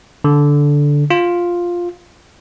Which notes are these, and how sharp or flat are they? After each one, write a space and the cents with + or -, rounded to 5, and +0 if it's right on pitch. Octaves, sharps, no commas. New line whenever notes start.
D3 -10
F4 +5